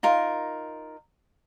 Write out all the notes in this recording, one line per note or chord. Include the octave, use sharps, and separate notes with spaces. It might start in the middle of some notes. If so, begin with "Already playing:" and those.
D#4 F4 A#4